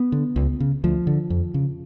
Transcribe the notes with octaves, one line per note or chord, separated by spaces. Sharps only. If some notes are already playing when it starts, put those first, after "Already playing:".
Already playing: B3
D3
C#2
C#3
D2 F3
D3
F2
C#3